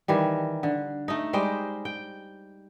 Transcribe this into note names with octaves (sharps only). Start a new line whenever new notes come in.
D#3 E3 G3
D3
A3 D#4
G3 G#3 C5 G5
G5